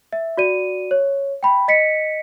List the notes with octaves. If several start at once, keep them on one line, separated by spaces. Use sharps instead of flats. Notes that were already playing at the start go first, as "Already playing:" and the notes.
E5
F#4 D5 D#7
C#5
G5 B5
D#5 B6 C#7